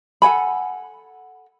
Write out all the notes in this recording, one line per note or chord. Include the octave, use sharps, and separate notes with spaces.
A4 F#5 G#5 B5